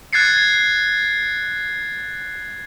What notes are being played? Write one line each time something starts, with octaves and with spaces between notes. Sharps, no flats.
F#6 G#6 A6 C7 C#7